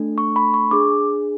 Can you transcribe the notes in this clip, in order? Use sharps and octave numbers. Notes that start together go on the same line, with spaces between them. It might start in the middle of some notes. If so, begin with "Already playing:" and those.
Already playing: A3 D4 A4
C#6
B5
C#6
D4 G#4 D6